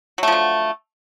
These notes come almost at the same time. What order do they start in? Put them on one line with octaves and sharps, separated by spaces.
F#3 A3 F3 D3